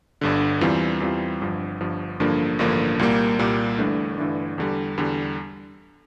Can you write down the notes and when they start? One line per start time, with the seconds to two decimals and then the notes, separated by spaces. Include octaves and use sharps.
0.21 G1 G2 D3
0.61 E2 E3 G3 C4 F4
1.00 E2 E3 G3 C4 F4
1.41 G1 G2 F3
1.80 G1 G2 F3
2.20 A1 G2 D3 F3 A#3
2.59 A1 G2 D3 F3 A#3
2.99 C2 A#2 G3 A#3
3.39 C2 A#2 G3 A#3
3.78 G1 G2 E3 A3 D4
4.18 G1 G2 E3 A3 D4
4.58 E2 D3 G3
4.98 E2 D3 G3